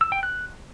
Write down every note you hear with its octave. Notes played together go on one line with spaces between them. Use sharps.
E6
G5
F#6